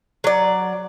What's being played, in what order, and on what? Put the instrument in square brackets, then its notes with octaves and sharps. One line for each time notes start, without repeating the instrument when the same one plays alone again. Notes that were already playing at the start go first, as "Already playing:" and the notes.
[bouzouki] F#3 D5